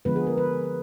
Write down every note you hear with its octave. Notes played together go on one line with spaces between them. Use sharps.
D3 F3 G#3 B3 B4
G#4
A#4
B4